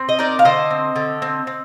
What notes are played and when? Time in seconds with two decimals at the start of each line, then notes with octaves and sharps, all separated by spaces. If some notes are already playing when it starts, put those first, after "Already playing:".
Already playing: C4
0.09 D#5
0.19 D#4 A#4 D5
0.39 F5
0.45 D3 C5 D#5
0.71 C4
0.96 D3
1.22 C4
1.47 C4